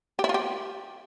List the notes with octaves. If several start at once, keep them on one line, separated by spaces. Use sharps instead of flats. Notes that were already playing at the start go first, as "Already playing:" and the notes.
G4
E4
F4
G4